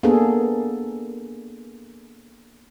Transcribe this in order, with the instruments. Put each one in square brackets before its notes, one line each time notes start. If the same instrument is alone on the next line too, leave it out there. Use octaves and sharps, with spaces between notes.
[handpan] A#3 B3 D4 G#4 A4